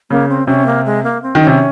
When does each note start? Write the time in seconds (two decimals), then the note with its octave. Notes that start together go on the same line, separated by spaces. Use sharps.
0.10 C#3 A#3
0.29 C4
0.47 C3 C#4
0.67 A#3
0.85 G#3
1.04 A#3
1.22 C4
1.35 D#3
1.41 C#4
1.47 C3